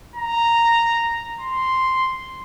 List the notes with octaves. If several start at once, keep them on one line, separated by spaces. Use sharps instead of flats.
A#5
C6